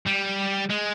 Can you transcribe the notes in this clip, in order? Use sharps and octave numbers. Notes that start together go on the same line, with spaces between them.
G3
G#3